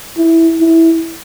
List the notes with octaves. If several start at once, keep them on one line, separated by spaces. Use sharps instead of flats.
E4
E4